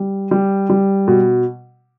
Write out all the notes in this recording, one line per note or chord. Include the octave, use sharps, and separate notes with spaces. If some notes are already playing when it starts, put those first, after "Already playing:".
Already playing: G3
G3
G3
B2